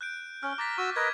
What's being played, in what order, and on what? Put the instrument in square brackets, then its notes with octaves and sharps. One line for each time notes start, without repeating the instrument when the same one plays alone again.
[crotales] F#6 G6 D7
[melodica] C#4 [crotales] F6
[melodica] A#5 [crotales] D6 A6 B6
[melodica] F#4 E6 [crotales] C#6
[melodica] A#4 B4 D#5 [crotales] G#6